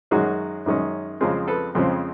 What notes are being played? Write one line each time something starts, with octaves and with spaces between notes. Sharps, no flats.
F#2 D#3 G#3 C#4 F#4 G#4
F#2 D#3 G#3 C#4
F2 C#3 F3 G#3 C4
A4 B4
F2 C#3 F3 G#3 C4